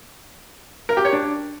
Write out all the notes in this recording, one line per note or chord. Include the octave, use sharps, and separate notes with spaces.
A#4
G4
C#5
D4